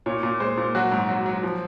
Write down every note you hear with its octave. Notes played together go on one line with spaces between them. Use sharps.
A#2 C#5
A#2
G#3 C5
A#2
F#3 F#4
G#2
F#3
F#3
F3